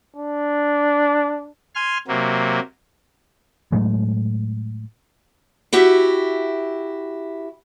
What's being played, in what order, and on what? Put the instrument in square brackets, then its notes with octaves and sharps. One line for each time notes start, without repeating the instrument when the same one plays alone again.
[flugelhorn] D4
[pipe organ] G#5 C6 F6
C3 F#3 A#3
[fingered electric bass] A2 F#3 G#3 A3
[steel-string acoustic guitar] E4 F#4 G4 E5